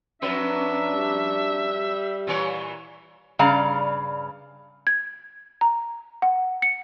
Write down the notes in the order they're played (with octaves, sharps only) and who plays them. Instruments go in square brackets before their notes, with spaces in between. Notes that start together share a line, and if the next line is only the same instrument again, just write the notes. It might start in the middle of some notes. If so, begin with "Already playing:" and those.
[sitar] F2 F#3 B4 [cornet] D4 [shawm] E5
[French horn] G3
[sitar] A#2 E3 C#5
[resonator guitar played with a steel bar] G2 C#3 G3 D5 F5 A#5
[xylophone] G#6
A#5
F#5
C#7